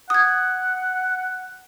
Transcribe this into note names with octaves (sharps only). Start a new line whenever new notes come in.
F#5 D#6 G#6